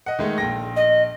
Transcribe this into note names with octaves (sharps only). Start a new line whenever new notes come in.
D#5 F#5
D#3 G#3 A3
A#1 G5 A#6
D#5